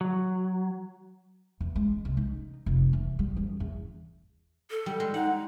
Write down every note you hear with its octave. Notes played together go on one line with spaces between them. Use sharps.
F#3
E2
G#3
C2
D#4
F1
E3
G3
F#2
E2
A4
G3
G#3
D#4 F#5